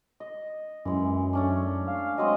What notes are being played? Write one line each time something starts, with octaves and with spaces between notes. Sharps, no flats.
D#5
F#2 E3 G#3
A3 C#4 D4
F5
F#3 G#3 C4 D#5